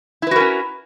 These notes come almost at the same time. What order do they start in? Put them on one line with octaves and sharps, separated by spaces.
E4 B4 F#4 A#4 C#4